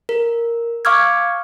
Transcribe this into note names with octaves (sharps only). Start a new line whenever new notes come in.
A#4
F5 C#6 D6 E6 F6 G#6